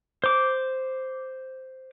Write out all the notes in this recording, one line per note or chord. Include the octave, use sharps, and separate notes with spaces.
C5 D6